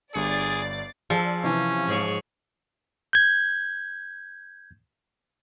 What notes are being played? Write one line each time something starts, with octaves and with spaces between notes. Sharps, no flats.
G1 G2 G#4 D5 A6 C7 C#7
F3 G#4 D5 E6
C3 E3 C#4
G#2 G#4 C#5
G6 G#6